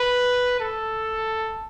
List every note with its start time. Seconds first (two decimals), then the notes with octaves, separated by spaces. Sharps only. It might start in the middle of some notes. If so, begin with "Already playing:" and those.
Already playing: B4
0.60 A4